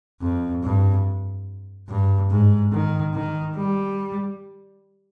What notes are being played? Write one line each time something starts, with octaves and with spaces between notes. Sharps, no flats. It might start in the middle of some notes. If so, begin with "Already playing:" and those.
F2
G2
G2
G#2
D#3
D#3
G3